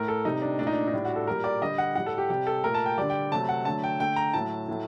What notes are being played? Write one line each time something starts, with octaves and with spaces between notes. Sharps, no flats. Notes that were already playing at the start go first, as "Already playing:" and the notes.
Already playing: A2 A3 A#4
A4
C3 G3 D#4
D4
A#2 A3 D4
D#4
D4
D#4
A2 G3 D4
F#4
A4
A#2 G3 A#4
D5
D3 G3 D#5
F#5
A2 G3 F#5
A4
G4
C3 G3 G4
A4
A#2 A3 A#4
A5
G5
D3 G3 D5
G5
C3 F#3 A3 A5
F#5
D3 F#3 A3 A5
G5
D3 A3 G5
A#5
A2 F#3 A3 A5
A2 F#3 A3